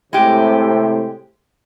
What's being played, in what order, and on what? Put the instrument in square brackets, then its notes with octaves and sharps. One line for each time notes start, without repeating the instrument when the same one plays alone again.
[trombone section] A2 C3 [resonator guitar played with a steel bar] G#3 G4